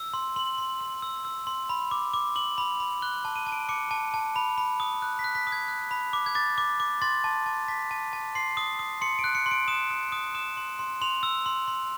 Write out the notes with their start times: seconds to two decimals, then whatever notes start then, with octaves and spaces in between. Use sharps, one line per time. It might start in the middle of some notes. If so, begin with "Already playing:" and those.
Already playing: E6
0.14 C6
0.36 C6 F#7
0.58 C6
0.81 C6
1.02 E6
1.25 E6
1.47 C6
1.69 B5
1.91 D6
2.14 D6
2.36 D6 F#7
2.58 B5
2.80 B5
3.02 F#6 G7
3.25 A5
3.36 D#7
3.46 A5
3.52 D7
3.69 D6 C#7
3.91 A5
4.14 A5
4.36 B5
4.58 B5
4.80 D#6
5.02 F#6
5.19 B6
5.24 F#6
5.35 B6
5.47 D#6
5.52 G#6
5.68 F#6
5.91 B5
6.13 D6
6.26 G#6
6.35 D6 A6
6.58 D6
6.80 D6
7.02 C6 A6
7.24 A5
7.46 A5
7.68 A5 B6
7.91 A5
8.13 A5
8.35 C6 C7
8.57 D#6
8.79 D#6
9.01 C6 C#7
9.19 D7
9.24 F#6
9.35 C#7
9.46 C6
9.51 D7
9.68 D#6 E7
9.90 D#6
10.12 D#6
10.35 D#6 E7
10.57 C6
10.79 C6
11.01 C6 F7
11.23 E6
11.46 C6
11.68 C6